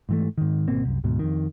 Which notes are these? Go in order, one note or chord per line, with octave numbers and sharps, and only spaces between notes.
G#2 E3 A3
G#2 D#3
G#1 B2 A#3 C4
C2 F#2
D2 G#2 B2
F2 D#3